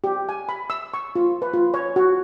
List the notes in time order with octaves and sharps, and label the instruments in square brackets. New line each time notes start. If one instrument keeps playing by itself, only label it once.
[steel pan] G4
G#5
B5
E6
C#6
F4
B4
F4
C#5
F#4